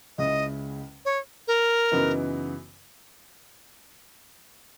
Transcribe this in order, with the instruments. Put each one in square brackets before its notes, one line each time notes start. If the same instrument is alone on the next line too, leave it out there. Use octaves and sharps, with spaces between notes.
[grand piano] C#2 C#3 G#3 C#4 E4 [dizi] D#5
[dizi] C#5
A#4
[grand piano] F#2 C#3 E3 B3 D#4